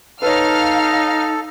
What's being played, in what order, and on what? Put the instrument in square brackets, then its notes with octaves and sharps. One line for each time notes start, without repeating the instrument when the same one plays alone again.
[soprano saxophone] D#4 [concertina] A4 [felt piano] B4 C#5 [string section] F5 F6